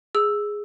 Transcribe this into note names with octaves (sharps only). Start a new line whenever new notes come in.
G#4 E6